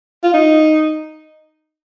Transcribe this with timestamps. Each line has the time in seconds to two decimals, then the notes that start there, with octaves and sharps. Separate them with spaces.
0.23 F4
0.34 D#4